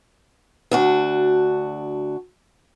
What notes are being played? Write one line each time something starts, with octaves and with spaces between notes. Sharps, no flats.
D2 D4 F#4